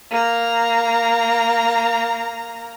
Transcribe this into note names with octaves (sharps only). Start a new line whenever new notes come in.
A#3 A#5